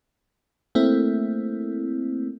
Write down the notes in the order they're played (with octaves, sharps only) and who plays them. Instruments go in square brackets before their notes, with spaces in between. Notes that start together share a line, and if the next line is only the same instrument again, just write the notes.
[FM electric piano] A3 A#3 C4 E4